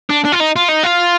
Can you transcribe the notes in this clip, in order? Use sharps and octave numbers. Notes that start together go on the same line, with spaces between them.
D4
D4
F4
D#4
F4
D#4
F4